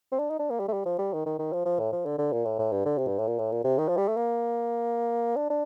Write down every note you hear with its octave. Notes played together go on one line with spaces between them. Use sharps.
C4
D4
D#4
D4
A#3
G3
A3
G3
F3
G3
D#3
D#3
D#3
F3
F3
A2
F3
D3
D3
A#2
A2
A2
G2
D3
C3
G2
A2
A#2
A2
A#2
C3
D#3
F3
G3
A3
A#3
D4
D4